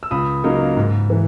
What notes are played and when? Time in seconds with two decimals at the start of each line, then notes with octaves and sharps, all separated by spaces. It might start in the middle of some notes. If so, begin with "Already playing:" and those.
0.03 E6
0.11 C#2 B5 D#6
0.44 C#3 F#3 A#3 D#4
0.76 G#2
1.10 E3